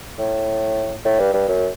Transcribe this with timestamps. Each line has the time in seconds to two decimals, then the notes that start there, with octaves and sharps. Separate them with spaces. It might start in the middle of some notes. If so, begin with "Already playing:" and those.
0.19 A2
1.05 A2
1.19 G2
1.33 G2
1.48 F#2